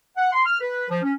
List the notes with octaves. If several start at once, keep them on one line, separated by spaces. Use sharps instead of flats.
F#5
C6
F6
B4
F3
C#4